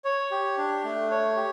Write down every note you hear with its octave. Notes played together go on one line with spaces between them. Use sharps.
C#5
G4
D4
A3
C#5
G4